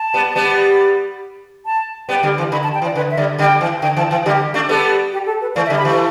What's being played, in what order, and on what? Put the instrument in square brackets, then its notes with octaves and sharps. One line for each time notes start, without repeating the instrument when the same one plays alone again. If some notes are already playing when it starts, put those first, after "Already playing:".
Already playing: [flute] A5
[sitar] G3 B3
G3 B3
[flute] A5
[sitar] G3 B3 [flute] G5
[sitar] D3 G3
E3
[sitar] D3 [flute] B5
[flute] A5
G5
[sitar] E3
[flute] D5
[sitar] D3 [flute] B4
[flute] E5
[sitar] D3 G3 [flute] D5
[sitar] D3 G3 [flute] G5
[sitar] E3
[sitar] D3 [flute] G5
[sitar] E3 [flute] A5
[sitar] E3 [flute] G5
[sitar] D3 G3 [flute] G4
[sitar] A3 D4
[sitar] G3 B3 [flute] A4
[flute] G4
A4
B4
[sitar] E3 A3 [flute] D5
[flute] E5
[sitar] D3 G3
[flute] B5
[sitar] E3 A3